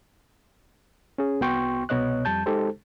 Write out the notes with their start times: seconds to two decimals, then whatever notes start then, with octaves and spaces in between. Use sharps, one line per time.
1.18 C#4 G#4
1.41 C2 B3 F#4 G5 C6 C#6
1.89 C2 B2 B3 C#5 D#5 F#6
2.25 F2 G3 A5 G6
2.46 G#3 D#4 G4 A4 C5